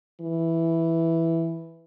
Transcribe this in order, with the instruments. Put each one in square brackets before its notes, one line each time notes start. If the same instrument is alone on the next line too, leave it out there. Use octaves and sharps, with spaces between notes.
[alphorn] E3